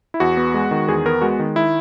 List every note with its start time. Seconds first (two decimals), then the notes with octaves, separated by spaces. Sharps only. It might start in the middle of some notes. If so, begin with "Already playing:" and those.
0.14 E4
0.20 E2 F#4
0.37 B3
0.54 G#3
0.71 D#3
0.88 E2 G#4
1.05 B3 A#4
1.21 G#3 F#4
1.39 D#3
1.56 E4